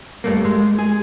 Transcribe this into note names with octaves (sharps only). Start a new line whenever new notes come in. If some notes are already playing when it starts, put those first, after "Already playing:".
G2 A3 A#3
G#3
G#4